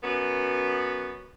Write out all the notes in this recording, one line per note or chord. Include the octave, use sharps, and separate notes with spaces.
F#2 B3